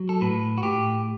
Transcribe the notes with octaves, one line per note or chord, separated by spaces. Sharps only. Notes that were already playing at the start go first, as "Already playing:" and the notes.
Already playing: F#3
A4
A2 B4
F#4
A2 G4